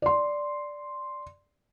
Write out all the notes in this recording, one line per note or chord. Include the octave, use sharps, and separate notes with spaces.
D5 C6